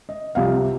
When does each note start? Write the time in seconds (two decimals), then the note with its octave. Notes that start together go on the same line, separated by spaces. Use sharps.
0.09 D#5
0.35 C2 C3 F3 C4 F5